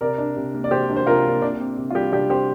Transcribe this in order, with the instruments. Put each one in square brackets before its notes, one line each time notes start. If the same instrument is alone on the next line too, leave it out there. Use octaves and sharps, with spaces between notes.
[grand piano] C3 [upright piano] A#4 D5
[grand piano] D4
C3
A#3
[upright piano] D5
[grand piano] C3 [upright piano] G4 C5
[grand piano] D4
[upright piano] C5
[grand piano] C3 [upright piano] F4 A#4
[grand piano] A#3
[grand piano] C3 [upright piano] D4
[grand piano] C4
C3
[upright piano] F4
[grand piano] G3 [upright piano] D4 G4
[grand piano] C3 [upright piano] D4 G4
[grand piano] C4 [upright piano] G4 C5